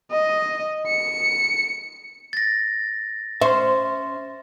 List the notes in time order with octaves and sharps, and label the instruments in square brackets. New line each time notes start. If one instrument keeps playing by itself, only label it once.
[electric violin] D#5
C#7
[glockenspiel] A6 A#6
[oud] C#4 C5 [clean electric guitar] E5 C6